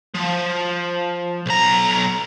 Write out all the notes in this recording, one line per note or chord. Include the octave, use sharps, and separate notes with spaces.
F3
B1 A#5